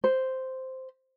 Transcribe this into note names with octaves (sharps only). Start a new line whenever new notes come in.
C5